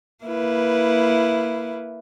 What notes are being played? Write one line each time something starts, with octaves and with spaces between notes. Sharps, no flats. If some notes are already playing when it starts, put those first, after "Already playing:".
A#3 E4 B4